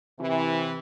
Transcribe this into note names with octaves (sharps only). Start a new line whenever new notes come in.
C3 E3